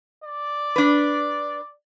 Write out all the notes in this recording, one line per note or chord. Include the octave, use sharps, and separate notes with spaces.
D5
D4 B4